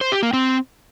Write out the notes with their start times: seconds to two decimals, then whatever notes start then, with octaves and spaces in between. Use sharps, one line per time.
0.01 C5
0.12 G4
0.23 A#3
0.33 C4